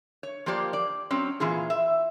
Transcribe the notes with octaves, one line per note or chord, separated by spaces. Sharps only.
C#5
F3 A#3 F4 G4 C5 D5
D5
F#3 C4 C#4
A#2 E3 F4 G#4
E5